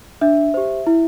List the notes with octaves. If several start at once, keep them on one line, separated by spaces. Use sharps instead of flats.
D4 E5
G4 C5
E4